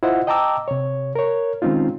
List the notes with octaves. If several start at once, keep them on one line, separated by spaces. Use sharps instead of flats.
E4 F4 C5 D#5 F#5
D#5 G5 A5 A#5 D6 E6
C3 C#5
A#4 C#5
D#3 G#3 C4 C#4 D#4 F4